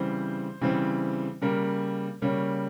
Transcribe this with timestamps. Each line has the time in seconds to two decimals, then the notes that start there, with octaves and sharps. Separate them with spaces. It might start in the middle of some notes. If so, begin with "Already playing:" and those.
Already playing: C#3 E3 G3 C4 C5
0.61 C#3 E3 G3 C4
1.42 C#3 G3 A#3 A#4
2.22 C#3 G3 A#3 C#5